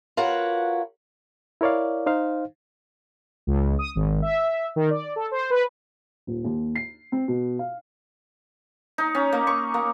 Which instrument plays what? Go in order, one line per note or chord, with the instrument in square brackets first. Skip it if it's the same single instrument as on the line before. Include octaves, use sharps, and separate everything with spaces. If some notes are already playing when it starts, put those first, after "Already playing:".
[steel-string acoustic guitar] F4 F#4 A#4 B4 C#5 F#5
[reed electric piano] E4 A#4 C#5 D5 F5
D#4 C5 F5
[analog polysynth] C#2
D#6
G#1
E5
D#3
D5
A4
C5
B4
[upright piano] D#1
D#2
C7
C4
B2
F5
[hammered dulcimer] D#4
C#4
A#3
C#6
A#3